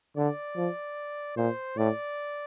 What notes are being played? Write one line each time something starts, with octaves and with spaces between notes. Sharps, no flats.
D3 D5
F3
A#2 C5
A2 D5